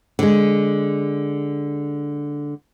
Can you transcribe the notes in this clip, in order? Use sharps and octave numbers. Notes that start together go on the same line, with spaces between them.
D3 G#3